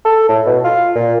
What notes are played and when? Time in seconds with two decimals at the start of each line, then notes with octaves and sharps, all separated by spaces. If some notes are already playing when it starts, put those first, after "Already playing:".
0.05 A4
0.29 A2
0.46 B2
0.65 F4
0.96 A#2